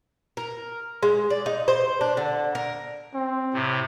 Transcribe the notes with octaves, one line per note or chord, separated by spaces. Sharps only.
A#4
G#3
D5
D#4
C5
D4
D3
A#4
C4
A2 C3